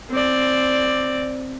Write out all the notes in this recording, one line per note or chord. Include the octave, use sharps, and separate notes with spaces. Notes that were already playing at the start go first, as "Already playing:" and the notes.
C4 D5